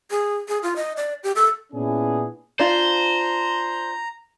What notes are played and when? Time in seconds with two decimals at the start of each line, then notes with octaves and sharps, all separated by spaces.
0.11 G#4
0.49 G#4
0.63 F4
0.76 D#5
0.97 D5
1.23 G4
1.36 A4
1.73 A#2 B3 C#4 D4 E4 G#4
2.59 D4 F4 C5 A#5